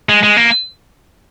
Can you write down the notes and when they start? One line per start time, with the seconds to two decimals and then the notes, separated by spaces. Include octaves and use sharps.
0.09 G#3
0.23 G#3
0.37 A#3